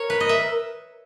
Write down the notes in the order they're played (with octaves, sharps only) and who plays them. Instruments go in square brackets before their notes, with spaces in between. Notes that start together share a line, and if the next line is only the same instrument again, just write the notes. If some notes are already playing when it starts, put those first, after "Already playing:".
Already playing: [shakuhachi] A#4 [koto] C#5
[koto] B4
D#5
E5